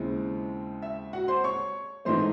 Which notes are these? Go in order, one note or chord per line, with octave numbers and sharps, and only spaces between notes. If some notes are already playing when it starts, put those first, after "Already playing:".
Already playing: D#2 C#3 G#3 C4 E4
E5
F#4 F#5
C5 C6
C#5 C#6
G#2 E3 A3 C4 D#4 C5 C6